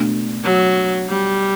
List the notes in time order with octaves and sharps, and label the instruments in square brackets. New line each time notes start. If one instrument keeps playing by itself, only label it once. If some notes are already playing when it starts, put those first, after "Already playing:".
Already playing: [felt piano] B2 A3 D4
[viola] F#3
G3